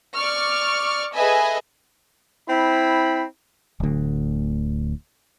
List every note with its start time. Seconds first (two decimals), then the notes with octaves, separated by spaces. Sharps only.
0.15 D5 C#6 F6
1.13 G#4 A4 B4 D#5 E5 G#5
2.49 C4 E4 B5
3.80 D1 D2